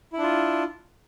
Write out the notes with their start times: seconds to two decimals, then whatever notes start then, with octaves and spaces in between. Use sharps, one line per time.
0.13 E4
0.18 D4
0.23 F4